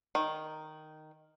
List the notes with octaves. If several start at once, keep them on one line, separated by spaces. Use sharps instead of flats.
D#3